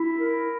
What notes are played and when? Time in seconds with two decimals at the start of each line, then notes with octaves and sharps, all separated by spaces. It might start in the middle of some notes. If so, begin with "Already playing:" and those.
Already playing: E4
0.17 A#4